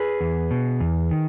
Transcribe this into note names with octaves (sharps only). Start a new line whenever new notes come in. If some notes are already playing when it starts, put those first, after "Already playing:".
Already playing: G#4 B4
E2
B2
E2
D#3